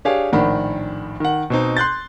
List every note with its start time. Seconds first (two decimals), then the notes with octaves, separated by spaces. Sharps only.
0.05 D4 G4 G#4 C#5 F5
0.32 A#1 A2 D#3 D4 F#5 B5
1.20 D#3 F#5
1.50 B2 C4 D#4
1.77 C6 F#6 G6 A6